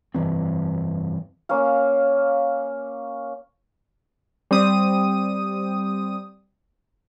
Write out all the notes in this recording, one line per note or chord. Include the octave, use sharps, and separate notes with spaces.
F1 G2 E3 C4
A#3 C#4 C#5 F5
G3 C4 D#6